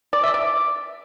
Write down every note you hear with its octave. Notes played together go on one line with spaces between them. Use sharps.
D5
E5
D5